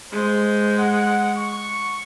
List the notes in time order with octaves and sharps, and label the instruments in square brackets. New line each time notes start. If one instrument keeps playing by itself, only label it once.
[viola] G#3 [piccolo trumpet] C5
[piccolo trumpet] F#5
C#6